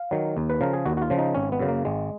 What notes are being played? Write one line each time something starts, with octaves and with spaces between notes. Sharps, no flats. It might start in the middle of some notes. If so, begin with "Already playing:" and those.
Already playing: F5
D#3 F#3
D#2
B4
C#3 F3 A#4
G#4
D#2 F#4
F#4
F4
C#3 F3
D#4
G#1 C#4
B3
F#2 C#3
A#3
G#1 G#3